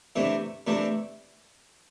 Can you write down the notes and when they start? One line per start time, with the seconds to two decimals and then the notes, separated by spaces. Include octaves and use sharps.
0.16 C3 E3 A3 D4
0.67 C3 E3 A3 D4